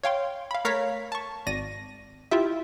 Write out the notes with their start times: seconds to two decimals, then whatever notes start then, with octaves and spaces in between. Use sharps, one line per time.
0.03 C#5 F5 G5 C6
0.51 F5 B5
0.65 A3 A#4 C#5 F5 A#5 B6
1.12 A5 C#6
1.47 G#1 D5 A#6 D#7
2.31 E4 F4 G4 E5